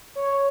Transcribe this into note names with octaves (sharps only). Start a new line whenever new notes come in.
C#5